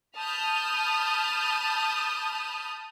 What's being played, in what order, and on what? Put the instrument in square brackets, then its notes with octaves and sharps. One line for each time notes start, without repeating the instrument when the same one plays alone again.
[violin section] A5 B5 D#6 F6 G6